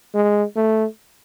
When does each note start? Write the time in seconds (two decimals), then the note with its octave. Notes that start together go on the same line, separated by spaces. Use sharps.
0.14 G#3
0.56 A3